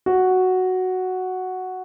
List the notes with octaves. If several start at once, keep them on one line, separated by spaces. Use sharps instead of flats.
F#4